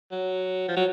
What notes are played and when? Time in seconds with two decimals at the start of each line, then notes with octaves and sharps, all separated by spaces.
0.11 F#3
0.68 F3
0.76 F#3